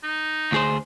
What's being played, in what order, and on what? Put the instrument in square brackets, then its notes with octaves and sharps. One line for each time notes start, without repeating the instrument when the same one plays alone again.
[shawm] D#4
[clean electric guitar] D2 G#4 C5